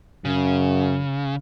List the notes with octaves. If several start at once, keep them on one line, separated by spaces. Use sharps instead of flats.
F#2 C#3